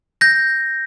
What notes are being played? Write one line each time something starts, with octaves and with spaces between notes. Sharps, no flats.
G6 A#6